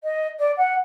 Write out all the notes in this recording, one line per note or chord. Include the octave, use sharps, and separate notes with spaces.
D#5
D5
F#5